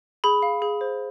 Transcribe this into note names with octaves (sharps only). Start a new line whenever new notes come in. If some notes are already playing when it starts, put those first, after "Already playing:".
G#4 B5
F5
G#4
C5